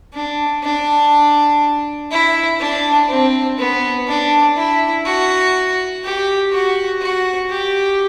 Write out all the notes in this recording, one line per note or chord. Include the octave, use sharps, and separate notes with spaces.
D4
D4
E4
D4
C4
B3
D4
E4
F#4
G4
F#4
F#4
G4